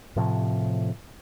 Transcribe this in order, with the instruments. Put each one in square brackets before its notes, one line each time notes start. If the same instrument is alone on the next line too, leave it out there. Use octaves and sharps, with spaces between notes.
[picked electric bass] A2 C3 F3